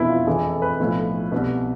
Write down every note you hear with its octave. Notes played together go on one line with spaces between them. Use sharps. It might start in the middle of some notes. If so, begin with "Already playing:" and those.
Already playing: F1 E2 B2 E4 B4
F4
F1 F2 E3 G#4
A4
B4
B1 A2 F3
C2 B2 B4